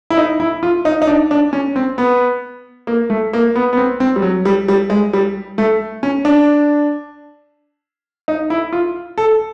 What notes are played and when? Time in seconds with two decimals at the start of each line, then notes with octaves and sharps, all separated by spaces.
0.10 E4
0.17 D#4
0.40 E4
0.63 F4
0.85 D#4
1.02 D#4
1.07 D4
1.31 D4
1.53 C#4
1.76 C4
1.98 B3
2.87 A#3
3.10 A3
3.33 A#3
3.55 B3
3.73 B3
3.77 C4
4.00 C4
4.16 G3
4.22 F#3
4.45 G3
4.68 G3
4.90 G#3
5.13 G3
5.58 A3
6.03 C#4
6.25 D4
8.28 D#4
8.50 E4
8.73 F4
9.18 A4